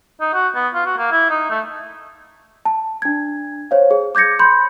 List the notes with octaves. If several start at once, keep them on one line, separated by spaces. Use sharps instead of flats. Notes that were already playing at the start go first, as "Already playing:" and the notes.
D#4
F#4
B3
F4
F#4
A#3
E4
D#4
A3
A5
D4 G#6
C5 C#5 F5
G#4
D6 G6 G#6 A#6 C#7
B5 C6 G6